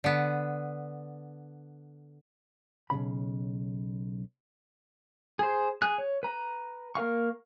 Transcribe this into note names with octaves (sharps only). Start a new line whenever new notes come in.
D3 B3
B1 G2 C#3 B5
G#4 C5
G#4 F#6
C#5
B4 A#5
A#3 A#4 F5 C#6